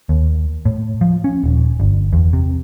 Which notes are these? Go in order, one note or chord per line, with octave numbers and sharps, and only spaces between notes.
D#2
A2
F3
C#4
D#1
G1
E2
C3